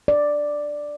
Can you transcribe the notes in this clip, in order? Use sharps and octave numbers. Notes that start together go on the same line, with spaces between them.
D5